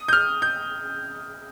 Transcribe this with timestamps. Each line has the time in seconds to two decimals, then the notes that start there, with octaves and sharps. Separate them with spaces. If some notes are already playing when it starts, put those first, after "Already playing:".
Already playing: D#6
0.08 G6
0.13 F6
0.42 G6